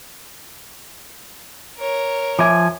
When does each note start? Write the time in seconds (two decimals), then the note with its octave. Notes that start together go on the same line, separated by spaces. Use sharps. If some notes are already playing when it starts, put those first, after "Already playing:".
1.78 A#4 C#5
2.39 F3 E5 G#5 D6